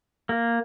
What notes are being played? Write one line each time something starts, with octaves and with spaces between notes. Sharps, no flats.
A#3